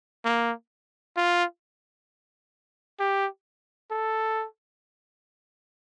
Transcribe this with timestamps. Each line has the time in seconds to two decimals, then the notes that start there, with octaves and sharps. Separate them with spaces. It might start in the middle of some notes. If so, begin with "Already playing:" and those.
0.25 A#3
1.17 F4
2.99 G4
3.91 A4